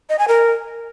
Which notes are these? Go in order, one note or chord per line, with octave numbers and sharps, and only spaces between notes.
D#5
G#5
A#4